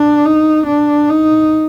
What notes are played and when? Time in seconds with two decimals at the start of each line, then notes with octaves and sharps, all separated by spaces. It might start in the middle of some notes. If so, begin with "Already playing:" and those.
Already playing: D4
0.25 D#4
0.66 D4
1.09 D#4